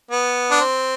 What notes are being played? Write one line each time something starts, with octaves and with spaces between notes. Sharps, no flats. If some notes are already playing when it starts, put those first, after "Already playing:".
B3
D4
C4